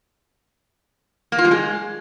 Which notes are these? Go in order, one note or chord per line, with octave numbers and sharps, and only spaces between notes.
A#3
F4
G3
G#3